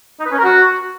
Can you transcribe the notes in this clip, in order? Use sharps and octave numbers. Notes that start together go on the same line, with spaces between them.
D#4
B4
C#4
A#4
F#4